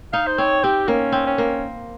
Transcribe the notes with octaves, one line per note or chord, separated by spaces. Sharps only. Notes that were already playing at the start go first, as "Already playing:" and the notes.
D#4 F5
C5
C4 C#5
C4 G4
A#3 C#4
C4
C#4
A#3